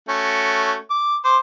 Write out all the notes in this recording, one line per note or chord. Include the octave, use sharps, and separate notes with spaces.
A3 C#4 F#4
D6
C5 D6